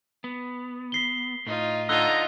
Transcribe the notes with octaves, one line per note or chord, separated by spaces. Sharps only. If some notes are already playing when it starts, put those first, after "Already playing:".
B3
B6 C7 G7
A2 D#4 F4
D3 D#4 F4 D#5 A#5 E6 F#6 G7